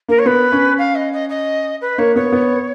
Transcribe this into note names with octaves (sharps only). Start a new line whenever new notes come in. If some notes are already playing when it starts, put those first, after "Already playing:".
A#3 A#4
C#5
B3 B4
C#4
F5
D#5
D#5
D#5
B4
A#3 C#5
B3 C#5
B3